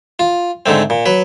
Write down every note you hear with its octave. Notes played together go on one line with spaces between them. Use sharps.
F4
G#2 D3 A3 C4
A#2
F#3 B4